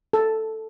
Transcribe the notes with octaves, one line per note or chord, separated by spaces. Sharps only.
A4